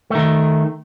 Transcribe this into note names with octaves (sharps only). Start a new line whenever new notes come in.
D#3 A3